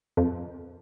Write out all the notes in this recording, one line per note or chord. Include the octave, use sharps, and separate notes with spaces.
F2